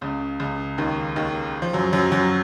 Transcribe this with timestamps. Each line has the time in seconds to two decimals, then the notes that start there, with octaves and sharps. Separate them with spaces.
0.01 C#2 C#3
0.40 C#2 C#3
0.78 D#2 D#3
1.16 D#2 D#3
1.62 F3
1.73 F#2 F#3
1.93 F#2 F#3
2.12 F#2 F#3